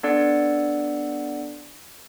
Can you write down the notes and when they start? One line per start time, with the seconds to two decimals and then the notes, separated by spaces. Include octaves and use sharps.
0.03 B3 D4 A4 D5 F#5